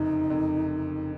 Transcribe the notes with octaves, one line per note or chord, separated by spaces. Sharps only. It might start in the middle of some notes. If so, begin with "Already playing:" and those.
Already playing: F#1 F2 C3 D#4
F#1 F2 C3